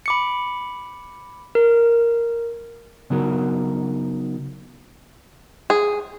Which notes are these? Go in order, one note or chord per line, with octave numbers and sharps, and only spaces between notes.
B5 D6 C#7
A#4
C#3 F#3 B3 D#4 F#4 A#4
G#4